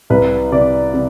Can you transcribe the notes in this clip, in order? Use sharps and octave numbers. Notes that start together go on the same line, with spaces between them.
C2 B4
C3 D5
C3